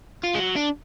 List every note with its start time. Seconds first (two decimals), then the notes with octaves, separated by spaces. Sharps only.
0.24 F4
0.35 G#3
0.40 F#3
0.56 D4